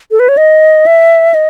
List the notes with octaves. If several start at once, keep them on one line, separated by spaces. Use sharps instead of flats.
A4
B4
C#5
D#5
E5
D#5